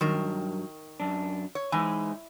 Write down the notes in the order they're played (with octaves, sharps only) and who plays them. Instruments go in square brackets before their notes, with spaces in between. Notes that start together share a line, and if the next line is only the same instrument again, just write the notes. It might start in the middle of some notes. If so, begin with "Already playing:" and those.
[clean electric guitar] G2 F#3 [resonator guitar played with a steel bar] D#3 A#4
[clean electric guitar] F#2 D4
[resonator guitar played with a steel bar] C#5
[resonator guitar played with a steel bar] E3 [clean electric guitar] G#3 D#4 G#5